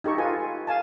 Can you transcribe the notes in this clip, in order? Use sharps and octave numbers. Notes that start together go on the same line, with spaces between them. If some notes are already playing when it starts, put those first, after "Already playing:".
D#4 G4 A4 C#6
F4 A4 B4 G#5
F5 G#5 A5